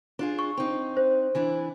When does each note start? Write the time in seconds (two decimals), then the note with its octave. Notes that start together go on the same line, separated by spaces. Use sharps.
0.19 D4 F4 G#4
0.39 C#6
0.57 C4 D#4
0.97 C5
1.35 E3 D4 E4